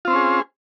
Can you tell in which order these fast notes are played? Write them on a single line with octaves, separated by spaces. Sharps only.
F4 C4 C5 C#4 G#4